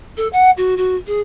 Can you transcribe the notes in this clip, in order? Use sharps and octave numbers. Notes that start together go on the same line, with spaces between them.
A4
F#5
F#4
F#4
G#4